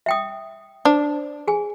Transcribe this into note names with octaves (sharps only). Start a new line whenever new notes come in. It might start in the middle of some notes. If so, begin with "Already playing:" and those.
E5 G5 D#6
D4 C5
G#4 G#5